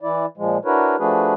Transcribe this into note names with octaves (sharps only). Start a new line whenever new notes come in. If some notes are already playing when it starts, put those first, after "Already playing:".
E3 E4 D5
A#2 F3 G#3
D4 E4 F#4 A#4 B4 C#5
F3 A3 D4 F#4 G#4 B4